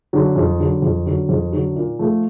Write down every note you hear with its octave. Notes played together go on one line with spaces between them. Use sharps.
D3 F#3
F2
D3 F#3
F2
D3 F#3
F2
D3 F#3
A#2
F3 A3